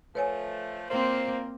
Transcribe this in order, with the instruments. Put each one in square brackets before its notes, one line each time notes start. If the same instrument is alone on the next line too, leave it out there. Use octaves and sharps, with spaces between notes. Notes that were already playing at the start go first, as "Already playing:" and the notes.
[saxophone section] F3 A3 [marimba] B4 C#5 G#5
[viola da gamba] A#3 C4 [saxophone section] F4 A#4 D5 [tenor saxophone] C5